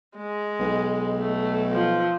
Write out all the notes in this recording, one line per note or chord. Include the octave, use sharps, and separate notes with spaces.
G#3
B1
A3
F3